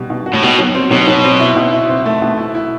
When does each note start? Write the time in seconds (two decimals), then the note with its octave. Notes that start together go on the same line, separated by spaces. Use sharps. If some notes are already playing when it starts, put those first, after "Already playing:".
Already playing: B2 G3 F#4
0.10 B2
0.26 F#4
0.33 A2
0.42 B2 G4
0.59 F#3
0.75 C4
0.91 B2 F#3
1.08 F#3
1.24 C4
1.40 E4
1.57 B2
1.73 E4
1.89 C4
2.06 A3
2.22 B2
2.38 E4
2.55 E4